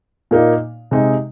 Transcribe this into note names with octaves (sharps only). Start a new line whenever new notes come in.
A#2 A#3 D#4
C3 G#3 D#4